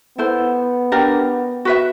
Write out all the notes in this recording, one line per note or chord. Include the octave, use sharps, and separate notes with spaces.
B3 E4 A4 C5
D4 G4 A#4
F#4 B4 E5